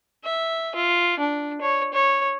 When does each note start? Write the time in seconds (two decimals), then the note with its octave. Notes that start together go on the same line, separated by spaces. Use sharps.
0.25 E5
0.76 F4
1.20 D4
1.62 C#5
1.94 C#5